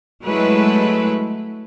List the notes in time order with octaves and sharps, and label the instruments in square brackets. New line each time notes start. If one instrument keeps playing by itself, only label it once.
[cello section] F#3 G#3 A3 E4 B4